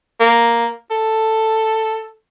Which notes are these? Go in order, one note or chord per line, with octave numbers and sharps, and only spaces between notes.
A#3
A4